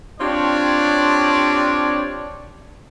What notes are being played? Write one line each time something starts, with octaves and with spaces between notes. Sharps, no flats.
C4 D4 F4 G4 C#5 D5